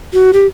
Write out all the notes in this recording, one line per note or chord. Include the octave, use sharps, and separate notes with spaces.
F#4
G4